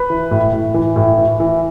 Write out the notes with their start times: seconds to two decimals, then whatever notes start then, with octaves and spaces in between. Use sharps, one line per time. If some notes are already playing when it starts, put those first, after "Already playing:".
Already playing: B4
0.10 E3
0.31 A2
0.53 A2
0.74 E3
0.96 A2
1.18 E3
1.40 E3